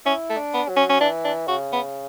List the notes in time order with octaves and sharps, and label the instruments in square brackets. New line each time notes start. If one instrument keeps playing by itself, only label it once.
[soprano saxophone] C#4 [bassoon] E4
[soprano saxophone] A3
[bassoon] D4
[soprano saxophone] B3
[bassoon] F#3
[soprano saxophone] C#4
C#4
[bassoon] E3 [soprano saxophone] D4
[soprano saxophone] D4
[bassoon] C#3 [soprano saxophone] F#4
[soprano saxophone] B3